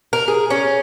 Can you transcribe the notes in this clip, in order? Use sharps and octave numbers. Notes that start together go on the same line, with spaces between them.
A#4
G#4
C#4